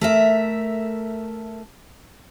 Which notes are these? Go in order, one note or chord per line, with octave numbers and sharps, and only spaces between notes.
A3 A#4 E5